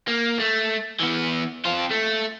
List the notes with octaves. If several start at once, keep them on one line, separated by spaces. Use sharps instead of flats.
A#3
A3
E3 B3
C4 F4
A3